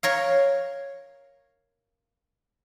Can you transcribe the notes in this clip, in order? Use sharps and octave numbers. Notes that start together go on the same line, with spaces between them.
A#4 C#5 F5